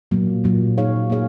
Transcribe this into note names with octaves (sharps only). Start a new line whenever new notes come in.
A#2 F#3 A#3
A#2 F#3 A#3
A#3 D#4 G#4 C#5 F5
A#3 D#4 G#4 C#5 F5